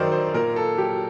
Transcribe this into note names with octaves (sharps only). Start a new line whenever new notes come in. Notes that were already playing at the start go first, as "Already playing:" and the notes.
Already playing: F#2 D#3 F#3 D#4 A#4 C5 D5
C5
A#2 A#4
A4
F#3 G4